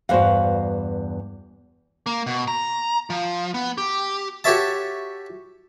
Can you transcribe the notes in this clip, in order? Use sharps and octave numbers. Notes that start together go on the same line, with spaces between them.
E2 G2 F#4 B4 C5 F5
A#3
B2
A#5
F3
B3
G4
F#4 G4 A4 C#5 E5 A5